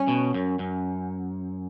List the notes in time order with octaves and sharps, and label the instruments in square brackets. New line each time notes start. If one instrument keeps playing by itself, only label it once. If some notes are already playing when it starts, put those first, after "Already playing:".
Already playing: [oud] C#4
[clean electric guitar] B2
F#2
F#2